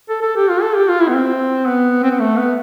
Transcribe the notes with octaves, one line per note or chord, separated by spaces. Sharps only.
A4
A4
G4
F4
A4
G4
F4
E4
B3
C4
B3
C4
B3
A3
B3